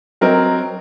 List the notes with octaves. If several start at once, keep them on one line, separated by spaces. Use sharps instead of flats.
F#3 C4 A#4 D#5